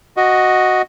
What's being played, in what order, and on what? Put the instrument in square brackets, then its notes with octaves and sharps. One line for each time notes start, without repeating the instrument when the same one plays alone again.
[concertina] F#4 D#5